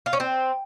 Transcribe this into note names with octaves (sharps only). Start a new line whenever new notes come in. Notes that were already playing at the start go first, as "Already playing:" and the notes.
F4
C#4
C4